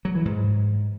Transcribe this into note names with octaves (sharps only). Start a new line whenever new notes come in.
F#3
E3
G#2